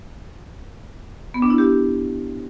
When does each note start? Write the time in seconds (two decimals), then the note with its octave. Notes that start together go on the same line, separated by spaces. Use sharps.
1.34 B3
1.42 D4
1.50 E4
1.58 G4